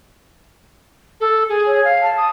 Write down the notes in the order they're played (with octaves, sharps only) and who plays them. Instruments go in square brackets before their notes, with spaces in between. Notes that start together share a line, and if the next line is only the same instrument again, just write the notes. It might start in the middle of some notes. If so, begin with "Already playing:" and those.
[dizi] A4
G#4
[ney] C#5
[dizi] F5
[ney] A5
[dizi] D#6